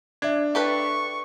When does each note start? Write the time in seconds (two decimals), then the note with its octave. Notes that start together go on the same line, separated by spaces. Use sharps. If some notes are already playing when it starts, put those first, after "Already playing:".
0.22 D4 E5 G#6
0.55 G4 A4 B4 C#6